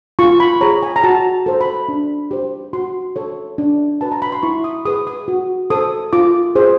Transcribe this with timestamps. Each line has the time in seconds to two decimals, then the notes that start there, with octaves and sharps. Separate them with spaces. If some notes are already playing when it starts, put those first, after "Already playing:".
0.19 F4 C#6
0.40 B5
0.61 G#4 C#5 A#5
0.83 G#5
0.96 A#5
1.03 F#4 A5
1.46 A4 C5
1.61 B5
1.89 D4
2.31 G4 C5
2.73 F#4 C6
3.16 A4 C#5
3.58 D4
4.01 F#4 B4 A5
4.12 A#5
4.22 B5
4.32 C6
4.43 E4 C#6
4.64 D#6
4.85 G#4 B4 D#6
5.07 D#6
5.28 F#4
5.70 A4 C5 D#6
6.13 F4 D6
6.55 G#4 C5